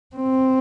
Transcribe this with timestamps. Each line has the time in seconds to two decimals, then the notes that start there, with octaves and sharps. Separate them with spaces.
0.15 C4